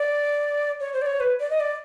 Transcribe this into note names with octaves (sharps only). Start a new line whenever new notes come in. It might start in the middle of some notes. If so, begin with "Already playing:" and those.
Already playing: D5
C#5
C5
D5
C#5
B4
D5
D#5
D5